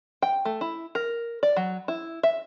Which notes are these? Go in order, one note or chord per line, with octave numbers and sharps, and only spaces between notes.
G5
A3
E4
A#4
D5
F#3
E4
E5